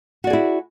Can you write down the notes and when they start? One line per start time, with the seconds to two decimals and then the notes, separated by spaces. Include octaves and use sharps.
0.24 F#4
0.27 D5
0.30 G#4
0.33 E4